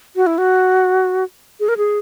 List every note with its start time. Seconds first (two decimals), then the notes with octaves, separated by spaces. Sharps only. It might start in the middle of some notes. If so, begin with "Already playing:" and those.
0.16 F#4
0.27 E4
0.38 F#4
1.60 G#4
1.69 A#4
1.77 G#4